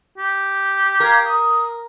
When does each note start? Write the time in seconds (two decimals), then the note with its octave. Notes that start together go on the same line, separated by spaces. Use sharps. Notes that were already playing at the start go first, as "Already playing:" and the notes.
0.18 G4
1.00 A#4 F5 G#6
1.24 D#6